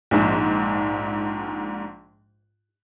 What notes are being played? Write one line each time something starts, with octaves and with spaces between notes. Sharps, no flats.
A#1 G#2